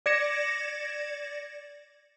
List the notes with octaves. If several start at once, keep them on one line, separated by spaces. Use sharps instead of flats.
D5 G#6 A#6 C#7 E7